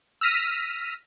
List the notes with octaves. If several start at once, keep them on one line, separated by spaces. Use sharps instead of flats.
E6 F6 A#6 B6 D#7